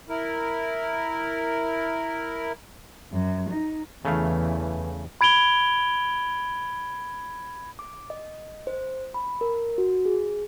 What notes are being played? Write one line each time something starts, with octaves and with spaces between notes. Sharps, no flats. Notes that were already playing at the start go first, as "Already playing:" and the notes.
E4 A#4
F#2
D#4
E2 C#3 E3 A3 F5
B5 G#6 D7 F7 G7
D6
D#5
C5
B5
A#4
F#4
G#4